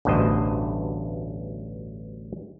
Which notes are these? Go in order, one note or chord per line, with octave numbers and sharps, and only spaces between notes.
A1 D2 G2 B2 C5 D#5